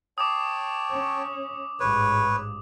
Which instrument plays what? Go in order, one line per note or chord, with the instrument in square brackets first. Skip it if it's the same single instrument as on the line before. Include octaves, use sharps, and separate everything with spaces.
[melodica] C#5 G5 A5 [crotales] D6 D#6
[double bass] C#4
[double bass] A1 G#2 [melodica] B4 C#5